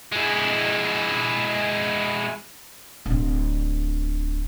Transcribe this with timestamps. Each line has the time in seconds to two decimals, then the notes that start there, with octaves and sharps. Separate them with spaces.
0.12 G#3 E4
3.06 D1 D3